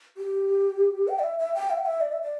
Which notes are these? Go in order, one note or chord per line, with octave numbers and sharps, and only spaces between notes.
G4
G5
D5
E5
E5
G5
E5
G5
E5
D5
E5
D5